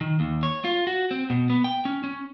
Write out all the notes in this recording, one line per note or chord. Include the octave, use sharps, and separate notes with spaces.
D#3
D#2
C#5
F4
F#4
C4
B2
B3
G5
C#4
C#4